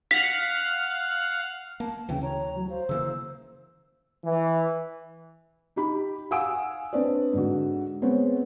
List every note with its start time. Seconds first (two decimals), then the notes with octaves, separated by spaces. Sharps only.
0.11 F5 F#5 B6
1.80 A#3 A5
2.09 D2 C#3 E3 G5
2.22 C#5 A#5
2.55 F#3
2.69 C5 F5
2.89 C#3 E3 A#3 E6
4.24 E3
5.76 D#4 G4 B5
6.31 F5 F#5 G#5 D#6 E6 D7
6.93 C4 D4 B4 C#5 D5
7.33 G#2 D3 F#4
8.02 G#3 B3 C4 C#5